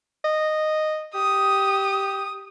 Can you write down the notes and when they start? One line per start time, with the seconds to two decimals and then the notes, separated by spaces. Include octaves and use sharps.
0.24 D#5
1.15 G4 D#6